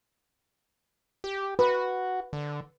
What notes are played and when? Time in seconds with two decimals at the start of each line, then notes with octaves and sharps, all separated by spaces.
1.24 G4
1.59 F#4 B4
2.33 D3